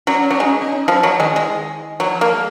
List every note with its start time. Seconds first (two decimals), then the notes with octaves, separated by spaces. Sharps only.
0.07 F#3 C#4
0.30 F#3 C#4
0.40 G#3 D#4
0.61 C#4
0.72 D#4
0.88 F3 F#3
1.03 F3 F#3
1.20 D#3 G#3
1.36 G#3
2.00 F3 F#3
2.21 A#3
2.32 G#3